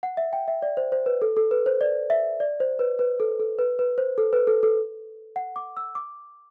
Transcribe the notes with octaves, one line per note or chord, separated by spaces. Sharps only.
F#5
E5
G5
E5
D5
C5
C5
B4
A4
A4
B4
C5
D5
E5
D5
C5
B4
B4
A4
A4
B4
B4
C5
A4
B4
A4
A4
F#5
D6
E6
D6